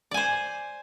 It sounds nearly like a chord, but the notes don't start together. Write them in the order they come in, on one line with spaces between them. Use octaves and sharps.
D5 G#5 C5